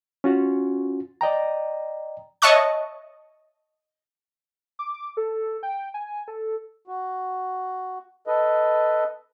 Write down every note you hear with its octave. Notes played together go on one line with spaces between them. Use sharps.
C#4 F4 F#4
D5 D#5 G5 A#5
C#5 D#5 E5 A5 C#6 F#6
D6
D6
A4
G5
G#5
A4
F#4
A4 B4 D#5